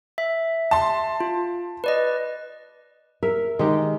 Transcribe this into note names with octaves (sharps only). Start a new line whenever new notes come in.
E5
A5 C6
F4
B4 D5 D#5
A#4 E5
D#3 G#3 D#4 G4